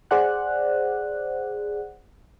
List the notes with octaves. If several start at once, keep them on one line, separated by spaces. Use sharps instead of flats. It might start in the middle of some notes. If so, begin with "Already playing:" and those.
G#4 C5 D5 F#5 F#6